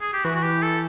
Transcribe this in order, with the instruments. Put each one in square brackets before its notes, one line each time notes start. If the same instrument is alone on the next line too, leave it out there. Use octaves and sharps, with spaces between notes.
[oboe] G#4
G4
[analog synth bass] E3 [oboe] F#4
[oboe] F#4
G4
A4